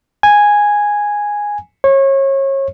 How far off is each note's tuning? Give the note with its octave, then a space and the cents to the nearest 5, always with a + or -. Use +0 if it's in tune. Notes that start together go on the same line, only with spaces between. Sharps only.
G#5 -5
C#5 -30